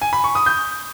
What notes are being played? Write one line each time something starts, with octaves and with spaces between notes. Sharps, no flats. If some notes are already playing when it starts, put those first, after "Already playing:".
G#5
B5
C#6
D#6
G6